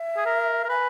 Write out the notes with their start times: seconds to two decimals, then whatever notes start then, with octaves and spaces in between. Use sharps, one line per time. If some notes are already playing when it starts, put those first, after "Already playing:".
Already playing: E5
0.17 G#4
0.26 A#4
0.64 A#4
0.69 B4 G#5